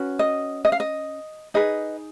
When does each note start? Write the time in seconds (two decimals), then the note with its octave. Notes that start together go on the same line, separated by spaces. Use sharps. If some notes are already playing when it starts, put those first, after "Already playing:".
Already playing: C#4 F#4 B4
0.19 D#5
0.65 D#5
0.72 F5
0.80 D#5
1.54 D#4 G#4 B4 D#5